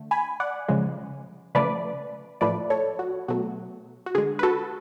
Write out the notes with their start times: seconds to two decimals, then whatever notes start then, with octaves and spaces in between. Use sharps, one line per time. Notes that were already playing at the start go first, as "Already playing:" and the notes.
Already playing: D3 A3
0.11 G#5 B5
0.40 D5 F#5
0.69 C#3 F3 G#3
1.55 C#3 F3 A3 B4 D5
2.41 A2 F3 A3 B4 D5
2.70 A4 C#5
2.99 F#4
3.28 B2 F#3 A3 F#4
4.06 F#4
4.15 D3 G#3 G#4
4.39 B4
4.43 F#4 A4